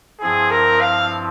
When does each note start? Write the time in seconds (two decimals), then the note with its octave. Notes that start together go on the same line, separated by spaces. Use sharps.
0.20 G2 F3 C4 E4 G#4
0.50 A#4
0.81 F5